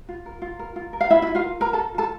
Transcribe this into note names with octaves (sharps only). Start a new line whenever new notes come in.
F4
A#4
F4
A#4
F4
A#4
F5
E4 F4 E5
E4 F4 E5
F4 F5
A#4
F4 A#4 A#5
A4 A#4 A5
F4 A4 A5